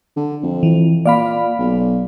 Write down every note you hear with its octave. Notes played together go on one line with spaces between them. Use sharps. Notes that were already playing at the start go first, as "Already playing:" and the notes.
D3
F2
E3
A#2 D5 F5 B5
B1